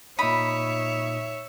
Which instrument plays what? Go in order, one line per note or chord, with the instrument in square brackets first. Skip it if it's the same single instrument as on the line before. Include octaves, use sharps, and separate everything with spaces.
[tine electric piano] A#2 D#4 D#6 [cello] C#5 E5 [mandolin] B5